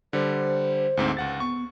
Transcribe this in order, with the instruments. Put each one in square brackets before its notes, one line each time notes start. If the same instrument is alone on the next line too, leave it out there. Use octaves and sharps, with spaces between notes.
[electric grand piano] D3 G3 [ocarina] C5
[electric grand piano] D2 G#2 C4
C#2 F#5 A6
[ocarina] B3 [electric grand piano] C#6